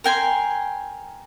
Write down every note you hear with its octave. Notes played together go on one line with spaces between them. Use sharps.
A#4 G5 G#5 C6